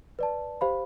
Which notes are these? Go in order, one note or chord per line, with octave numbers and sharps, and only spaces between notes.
B4 D5 A5
G4 C5 F5 B5